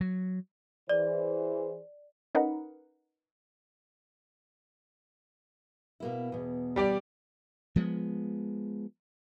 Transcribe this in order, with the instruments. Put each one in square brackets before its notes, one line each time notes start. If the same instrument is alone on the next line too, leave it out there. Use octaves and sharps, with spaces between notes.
[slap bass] F#3
[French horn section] E3 G#4 C5 [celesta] D5
[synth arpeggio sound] C#4 D#4 A#4 B4 F#5
[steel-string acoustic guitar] B2 A#3 E4
E2 B2
[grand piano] G3 G4 D5
[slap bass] F3 G#3 A3 B3